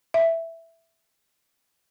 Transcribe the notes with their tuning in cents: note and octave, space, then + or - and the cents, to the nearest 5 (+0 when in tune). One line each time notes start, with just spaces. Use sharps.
E5 +0